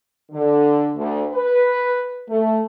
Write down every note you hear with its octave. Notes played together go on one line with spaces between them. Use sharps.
D3
D2
B4
A3